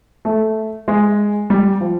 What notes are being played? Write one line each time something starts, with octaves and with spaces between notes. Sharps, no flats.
A3
G#3
G3
F3